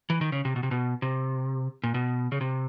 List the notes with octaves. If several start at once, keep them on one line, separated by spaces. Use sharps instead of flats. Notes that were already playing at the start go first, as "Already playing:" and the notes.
E3
D#3
C#3
C3
B2
C3
B2
C3
A#2
B2
C#3
C3